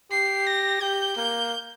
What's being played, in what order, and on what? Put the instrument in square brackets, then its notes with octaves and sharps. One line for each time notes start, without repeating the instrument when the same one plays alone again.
[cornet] G4 [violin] C7
[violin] A#6
[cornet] G4 [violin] G6
[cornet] A#3 [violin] G6